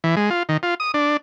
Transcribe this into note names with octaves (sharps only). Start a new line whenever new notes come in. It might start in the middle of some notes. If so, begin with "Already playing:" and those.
E3
G#3
F4
D#3
F4
D#6
D4